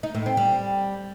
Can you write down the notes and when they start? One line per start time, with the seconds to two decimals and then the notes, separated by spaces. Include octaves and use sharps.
0.03 D#4
0.15 A2
0.26 C4
0.37 G3